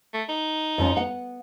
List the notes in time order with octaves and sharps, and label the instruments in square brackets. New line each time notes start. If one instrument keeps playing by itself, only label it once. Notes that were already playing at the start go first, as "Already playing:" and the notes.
[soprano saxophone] A3
D#4
[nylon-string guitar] F2 F3 C#4
B3 F#5